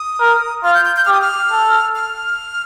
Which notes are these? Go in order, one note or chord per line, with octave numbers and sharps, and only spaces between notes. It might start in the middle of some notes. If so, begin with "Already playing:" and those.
Already playing: D#6
A#4
F4 F6
G6
G6
G6
G4 F6
D#6
F6
A4
F6